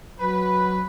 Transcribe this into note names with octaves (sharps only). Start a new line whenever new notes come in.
F#3 B4 B5